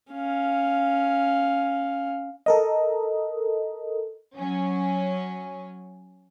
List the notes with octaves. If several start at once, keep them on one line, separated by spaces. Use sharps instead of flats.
C#4 F5
A4 A#4 D#5
F#3 C#4